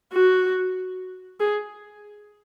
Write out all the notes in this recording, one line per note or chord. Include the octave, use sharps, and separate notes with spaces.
F#4
G#4